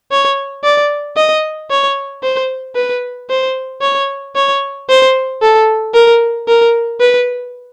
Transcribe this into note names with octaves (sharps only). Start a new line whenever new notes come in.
C#5
D5
D#5
C#5
C5
B4
C5
C#5
C#5
C5
A4
A#4
A#4
B4